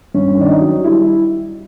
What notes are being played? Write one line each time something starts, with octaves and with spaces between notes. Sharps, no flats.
G2 C#4
D#3 D4
D#4
F#3
G3 E4